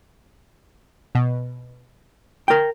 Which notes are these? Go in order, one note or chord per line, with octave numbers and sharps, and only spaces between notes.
B2
A#4 G5